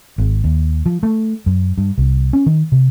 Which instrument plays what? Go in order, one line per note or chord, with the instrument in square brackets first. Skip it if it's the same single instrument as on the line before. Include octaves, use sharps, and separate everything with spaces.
[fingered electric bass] G#1
D#2
F3
A3
F#2
G2
C2
C#4
D#3
C3